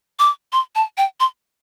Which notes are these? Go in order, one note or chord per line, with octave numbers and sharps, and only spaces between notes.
D6
C6
A5
G5
C6